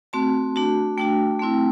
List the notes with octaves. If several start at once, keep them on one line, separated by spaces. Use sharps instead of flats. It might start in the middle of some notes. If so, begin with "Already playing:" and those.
A3 C4 F#4 A5
A3 D4 F#4
A3 D4 F#4 G5
A3 C4 E4